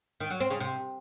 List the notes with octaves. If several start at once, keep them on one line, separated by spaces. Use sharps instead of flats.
D#3
F#3
C4
C#3
C3